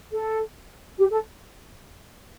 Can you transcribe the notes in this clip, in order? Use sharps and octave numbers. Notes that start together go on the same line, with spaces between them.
A4
G4
A4